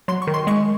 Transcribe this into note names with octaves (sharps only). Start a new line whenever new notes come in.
F#3 C6
C#6
D#3
C6
G#3 C#6